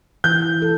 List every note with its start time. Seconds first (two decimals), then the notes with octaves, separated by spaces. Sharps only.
0.24 E3 G6
0.62 A4